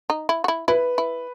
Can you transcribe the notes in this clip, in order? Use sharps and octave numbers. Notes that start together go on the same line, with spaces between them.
D#4
E4
F#4
E4
E4 B4
E4